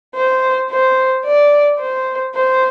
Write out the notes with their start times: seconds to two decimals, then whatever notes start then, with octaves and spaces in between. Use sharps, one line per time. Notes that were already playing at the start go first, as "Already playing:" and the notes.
0.15 C5
0.71 C5
1.26 D5
1.79 C5
2.35 C5